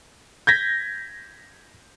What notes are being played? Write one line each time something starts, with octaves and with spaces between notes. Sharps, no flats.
G6 G#6 A#6 B6